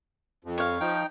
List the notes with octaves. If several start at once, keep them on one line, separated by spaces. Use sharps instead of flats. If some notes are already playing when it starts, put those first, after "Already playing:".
F2
C#5 F5
F3 D#4 G5